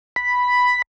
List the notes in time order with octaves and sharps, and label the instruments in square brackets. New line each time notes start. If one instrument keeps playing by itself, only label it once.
[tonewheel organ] B5